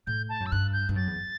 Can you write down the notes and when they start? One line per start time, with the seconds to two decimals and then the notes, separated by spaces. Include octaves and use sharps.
0.07 A2 G6
0.29 A5
0.40 F#2
0.46 E6
0.52 G2 F#6
0.73 G6
0.89 G2
0.96 F#2 A6
1.07 E2